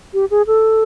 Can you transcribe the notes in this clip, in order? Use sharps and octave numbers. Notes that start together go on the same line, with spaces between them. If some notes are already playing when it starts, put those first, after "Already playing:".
G4
G#4
A4